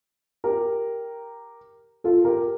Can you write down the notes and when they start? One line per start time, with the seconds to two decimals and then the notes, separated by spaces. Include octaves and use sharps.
0.44 G4 A#4
2.04 F4 A4
2.25 G4 A#4